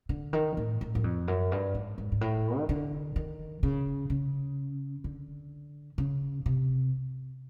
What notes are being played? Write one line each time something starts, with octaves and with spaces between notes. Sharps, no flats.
D3
D#3
A2
A2
F#2
F2
F#2
G2
G#2
G#2
G#2
A2
D#3
D3
D#3
C#3
C#3
D3
C#3
C3